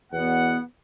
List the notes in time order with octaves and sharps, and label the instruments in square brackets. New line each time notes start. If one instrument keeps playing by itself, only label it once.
[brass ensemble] E2 B2 F#5 [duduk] B3